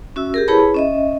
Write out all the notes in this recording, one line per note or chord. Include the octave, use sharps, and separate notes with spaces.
C#4 F#4 E5 E6
G4 G#4 A#4
E4 G#4 B4 C#5 A5 B5
C#4 D#5 E5